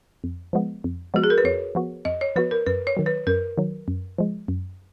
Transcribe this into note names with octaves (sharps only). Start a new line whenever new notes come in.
F2
F3 G#3 B3
F2
F3 G#3 B3 F#4
G#4
A#4
B4
F2 C#5
F3 B3 F#4
F2 D#5
C#5
F3 B3 F#4 B4
A#4
F#2 B4
C#5
D#3 F#3
B4
F#2 A#4
D#3 F#3
F#2
F3 G#3
F#2